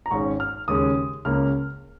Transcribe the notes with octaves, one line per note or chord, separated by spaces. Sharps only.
A#5
G#1 G#2 G#3 C#4 C#6
F6
D#2 C#3 G#3 C#4 D#6
C#2 C#3 A#3 C#4 F6